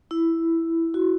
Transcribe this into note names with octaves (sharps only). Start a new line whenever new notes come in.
E4
F#4